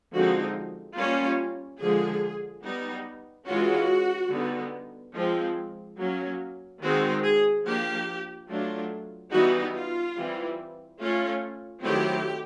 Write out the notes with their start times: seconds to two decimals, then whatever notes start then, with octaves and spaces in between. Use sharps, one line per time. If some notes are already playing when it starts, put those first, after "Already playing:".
0.13 D3 F3 G#3 C4 D#4 F#4
0.96 G3 A#3 C#4 F4
1.80 D3 F3 G#3 G#4
2.64 G3 B3 D#4
3.47 E3 G#3 C#4 F4 F#4
4.31 D3 G3 B3 D#4
5.15 F3 G#3 C4
5.98 F#3 A#3 C#4
6.82 D#3 G#3 C4 D#4 F#4
7.23 G#4
7.65 F3 A#3 D4 G4
8.49 F#3 A3 D4 F4
9.32 E3 G3 B3 D#4 F#4
9.75 F4
10.17 E3 G3 C4
11.00 A3 C#4 F4
11.83 D#3 F#3 A3 C4 E4 G4